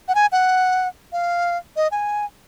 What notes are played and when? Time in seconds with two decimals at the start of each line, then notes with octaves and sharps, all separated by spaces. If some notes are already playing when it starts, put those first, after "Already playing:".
0.08 F#5
0.15 G#5
0.32 F#5
1.12 F5
1.76 D#5
1.92 G#5